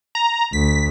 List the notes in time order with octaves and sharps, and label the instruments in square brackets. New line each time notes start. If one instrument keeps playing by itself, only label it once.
[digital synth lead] A#5
[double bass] D2 [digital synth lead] B6